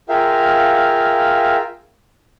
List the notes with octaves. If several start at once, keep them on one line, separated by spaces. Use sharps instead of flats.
F4 G#4 A#4 E5 F5 G5